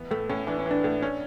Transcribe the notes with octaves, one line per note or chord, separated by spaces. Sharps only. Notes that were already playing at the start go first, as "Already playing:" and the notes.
Already playing: E3 B3
A2 A3
A2 C#4
E3 D4
C#4
E3
D4
A2
C#4